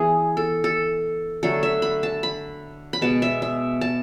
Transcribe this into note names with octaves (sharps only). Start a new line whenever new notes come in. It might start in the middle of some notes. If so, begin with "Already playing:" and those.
Already playing: E3 B3 G#4
A4
A4
D3 F#3 A3 A4
E5
B5
A5
B5
B5
B2 G#3 B3 A5
E5
E5
A5